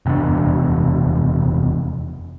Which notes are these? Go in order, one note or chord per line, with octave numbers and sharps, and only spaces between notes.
F1 E2 D4